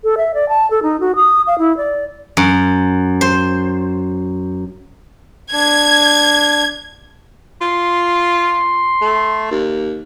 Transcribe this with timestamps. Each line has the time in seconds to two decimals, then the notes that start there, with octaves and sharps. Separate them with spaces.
0.04 A4
0.18 E5
0.34 D5
0.49 A5
0.71 A4
0.83 D#4
1.00 F#4
1.16 D#6
1.47 F5
1.59 E4
1.77 D5
2.37 F#2
3.21 C5
5.53 D4 G#6
7.61 F4 C6
9.01 A3
9.51 D#2